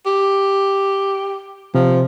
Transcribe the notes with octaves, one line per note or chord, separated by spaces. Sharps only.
G4
C3 F3